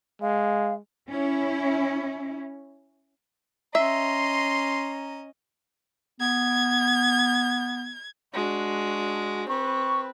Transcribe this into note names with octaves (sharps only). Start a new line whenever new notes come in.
G#3 F5
C#4 E4
C#4 D#5 E5 A#5 C6
B3 G#6
G#3 D4 F#4
C4 B4 C#6